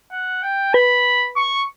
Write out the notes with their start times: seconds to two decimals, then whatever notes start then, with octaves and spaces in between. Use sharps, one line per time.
0.12 F#5
0.43 G5
0.74 B4 B5
1.36 C#6